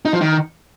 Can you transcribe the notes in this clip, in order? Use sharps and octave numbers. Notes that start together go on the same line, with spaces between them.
D#4
F3
D#3